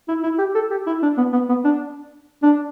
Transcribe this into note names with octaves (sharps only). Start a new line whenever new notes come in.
E4
E4
G4
A4
G4
E4
D4
B3
B3
B3
D4
D4